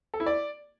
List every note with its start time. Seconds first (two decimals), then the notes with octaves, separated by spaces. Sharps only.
0.14 A4
0.20 E4
0.26 D5